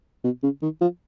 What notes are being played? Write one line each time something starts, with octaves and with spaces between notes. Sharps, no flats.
B2
C#3
D#3
F3